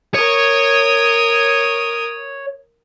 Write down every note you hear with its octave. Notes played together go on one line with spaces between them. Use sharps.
A#4 C#5 D#6